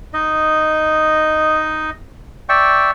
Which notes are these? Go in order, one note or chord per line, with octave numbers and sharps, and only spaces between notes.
D#4 D#5
D5 E5 G5 C#6